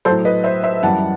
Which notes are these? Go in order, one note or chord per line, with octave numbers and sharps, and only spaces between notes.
A2 F#3 A4 C5
B4 D#5
C5 E5
C5 E5
F#2 E3 G3 F#5 A5